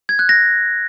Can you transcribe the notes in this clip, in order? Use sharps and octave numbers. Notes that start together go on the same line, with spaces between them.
G#6
F#6
A#6